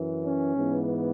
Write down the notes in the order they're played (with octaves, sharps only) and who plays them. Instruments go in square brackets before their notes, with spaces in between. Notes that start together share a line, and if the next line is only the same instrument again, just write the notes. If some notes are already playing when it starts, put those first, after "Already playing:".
Already playing: [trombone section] F#2 E3
C#4
G#2 E3 B3